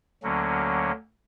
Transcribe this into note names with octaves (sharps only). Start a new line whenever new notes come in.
D2 D3 F#3 A#3 C#4